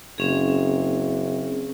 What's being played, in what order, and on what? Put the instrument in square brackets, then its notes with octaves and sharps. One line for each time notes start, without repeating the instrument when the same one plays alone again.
[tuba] F#1 [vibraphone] C4 C#4 G#4